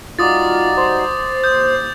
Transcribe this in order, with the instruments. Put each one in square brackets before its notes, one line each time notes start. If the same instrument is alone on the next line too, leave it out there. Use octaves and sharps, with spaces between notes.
[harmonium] G3 D#4 F#4 [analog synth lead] F4 [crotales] D6 D#6 A6
[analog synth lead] C5
[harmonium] D#2 [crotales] D#6 G6